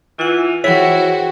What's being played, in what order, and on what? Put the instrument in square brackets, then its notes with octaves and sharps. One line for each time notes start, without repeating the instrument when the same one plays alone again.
[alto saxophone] E3 [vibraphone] F4 F#5
[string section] E3 F#4 C5 [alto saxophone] E4 [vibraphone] G#4 G5 [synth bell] C#5 B6